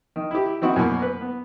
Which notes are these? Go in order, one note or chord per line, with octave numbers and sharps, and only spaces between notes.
D#3
E4 G4
D#3 C4 E4 F#4
F#2 B2 A#3 C#6
B4
B3